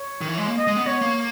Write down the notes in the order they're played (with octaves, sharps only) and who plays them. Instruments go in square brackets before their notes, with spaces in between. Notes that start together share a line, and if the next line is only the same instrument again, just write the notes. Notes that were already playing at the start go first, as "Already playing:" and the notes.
Already playing: [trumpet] C#5
[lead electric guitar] D#3
E3
G#3
A#3
[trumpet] D#5
[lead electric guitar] G#3
B3
[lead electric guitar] B3 [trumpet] C#5
[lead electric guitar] A#3